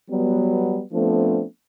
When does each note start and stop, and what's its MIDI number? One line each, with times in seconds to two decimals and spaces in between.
0.10 0.82 54
0.10 0.82 55
0.10 0.82 59
0.93 1.44 53
0.93 1.44 57
0.93 1.44 59
0.93 1.44 60
0.93 1.44 62